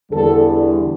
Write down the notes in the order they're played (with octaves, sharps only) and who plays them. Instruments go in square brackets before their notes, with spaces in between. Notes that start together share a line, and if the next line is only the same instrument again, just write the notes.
[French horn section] E2 D3 G3 A4